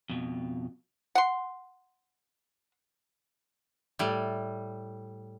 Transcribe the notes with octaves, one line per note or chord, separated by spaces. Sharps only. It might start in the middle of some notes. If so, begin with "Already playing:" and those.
F2 B2
F#5 C6
A2 G3